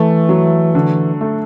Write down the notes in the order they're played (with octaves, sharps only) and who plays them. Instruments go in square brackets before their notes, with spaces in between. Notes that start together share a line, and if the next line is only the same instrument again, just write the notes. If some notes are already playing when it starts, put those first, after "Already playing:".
Already playing: [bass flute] E3 [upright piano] A3
[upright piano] F#3
D3
A3